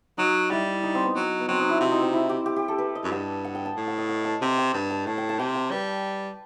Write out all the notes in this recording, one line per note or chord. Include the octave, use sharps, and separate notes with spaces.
F#3 D#4
G3 E4
D#4
C4
B3
F#3
B3
F#3 C4
D#4
E4
C3 F#4
D#4
C4
E4
G4
G4
G4
A4
B4
D#5
F#2
G2 F#5
F#5
G5
A5
A2
F#5
D#5
F#5
A5
C3 G5
G5
G2 G5
A5
A2 A5
G5
A5
C3 G5
G5
G3 B4